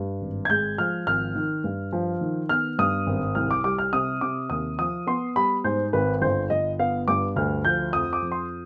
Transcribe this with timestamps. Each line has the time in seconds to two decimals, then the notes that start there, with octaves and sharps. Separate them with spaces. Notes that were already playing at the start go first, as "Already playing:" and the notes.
Already playing: G2 G3
0.21 G#1
0.45 G#6
0.50 G#3 G6
0.78 F3 F6
1.07 G#1 F6
1.35 D#3
1.64 G2
1.92 F3
2.21 D#3
2.49 B3 F6
2.78 G2 D#6
3.07 G#1
3.35 C2 F6
3.51 D6
3.64 G3 D6
3.79 F6
3.93 C3 D#6
4.21 C3 D6
4.50 D#2 D#6
4.79 F3 D#6
5.07 B3 C6
5.36 G3 B5
5.64 G#2 C5
5.93 G#1 B4
6.21 G1 C5
6.50 G1 D#5
6.79 B3 F5
7.08 G2 D6
7.36 D2 F6
7.65 F3 G6
7.93 F2 D#6
8.13 D6
8.22 F2
8.32 C6